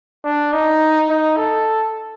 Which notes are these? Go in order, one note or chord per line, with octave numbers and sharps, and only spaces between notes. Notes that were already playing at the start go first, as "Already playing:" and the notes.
D4
D#4
D#4
A4